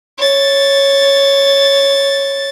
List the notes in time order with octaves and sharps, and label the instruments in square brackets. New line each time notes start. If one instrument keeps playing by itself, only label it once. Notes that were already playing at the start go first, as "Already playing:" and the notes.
[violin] C#5 A6